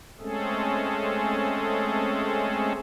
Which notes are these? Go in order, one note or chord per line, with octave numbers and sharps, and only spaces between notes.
G#3 A3 C4 C#4 G#4 A4